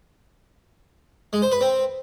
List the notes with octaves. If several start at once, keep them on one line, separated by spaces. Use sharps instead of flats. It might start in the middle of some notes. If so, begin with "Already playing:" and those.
G#3
C5
B4
C4